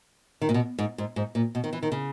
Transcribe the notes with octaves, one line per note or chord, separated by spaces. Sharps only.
D#3
A#2
B2
G#2
G#2
G#2
A#2
B2
D#3
E3
D#3
C#3